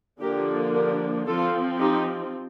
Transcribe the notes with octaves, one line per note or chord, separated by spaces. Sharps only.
D3 F3 A#3 D4 G4 A#4
G4 A#4
F3 C4 F4 A4
D#4 G4